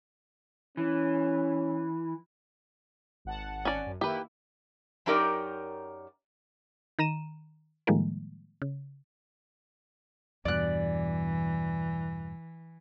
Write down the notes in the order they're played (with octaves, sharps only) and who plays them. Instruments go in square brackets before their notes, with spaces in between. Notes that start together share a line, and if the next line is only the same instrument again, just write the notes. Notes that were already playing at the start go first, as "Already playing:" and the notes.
[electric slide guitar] E3 [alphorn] C#4
[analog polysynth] G#1 F#5 A5
[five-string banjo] C#4 D5
[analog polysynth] F#2
[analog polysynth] D#3 A#3 E4 [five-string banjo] G4 B4
[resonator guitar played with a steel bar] F#2 F#3 D#4 G4 A#4 D5
[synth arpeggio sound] D#3 A#5 D#7 E7
A2 D#3 F3 G3 G#3 A#3
C#3
[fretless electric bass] E2 G2 B2 [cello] E3 [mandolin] D5 F#6